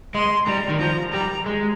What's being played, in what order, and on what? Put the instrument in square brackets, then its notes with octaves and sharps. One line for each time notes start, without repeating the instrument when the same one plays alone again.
[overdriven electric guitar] G#3 [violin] C6
[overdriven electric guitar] G3 [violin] A#5
[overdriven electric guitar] D#3
[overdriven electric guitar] F3 [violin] A#5
[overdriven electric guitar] G3 [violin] A#5
[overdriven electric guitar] G#3